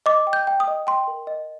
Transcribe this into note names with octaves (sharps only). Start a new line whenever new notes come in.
D#5 D6
G5
G6
G5
D#6
D#5
G5 C6
A#4
D#5